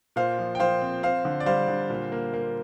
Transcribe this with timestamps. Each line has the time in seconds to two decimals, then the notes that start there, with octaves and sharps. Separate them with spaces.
0.16 A#2 C5 F5
0.38 F3
0.55 G5
0.60 F3 C5 F5
0.82 C4
1.03 C4 C5 F5
1.25 D3
1.40 D5
1.46 G3 C5 F5
1.68 D3
1.90 A#2
2.12 A#3
2.34 A#3